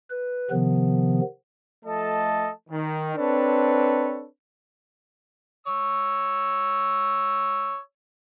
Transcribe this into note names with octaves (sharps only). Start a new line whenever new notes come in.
B4
C3 D#3 F3 B3
F3 A3 A4 D#5 A5
D#3
C4 D4 A4 B4 C#5
C#5 E6